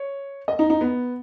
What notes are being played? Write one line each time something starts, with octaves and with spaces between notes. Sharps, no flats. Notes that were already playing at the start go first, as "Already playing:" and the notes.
Already playing: C#5
D#5
D#4
D#4
B3